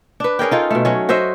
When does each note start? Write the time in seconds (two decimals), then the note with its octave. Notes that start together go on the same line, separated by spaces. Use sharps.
0.20 D4 B4
0.39 C#4 G#4 A#4 G5
0.51 D#4 F4 A4
0.71 B2 A3
0.85 F#3 C#4
1.09 F#4 C5 D#5 E5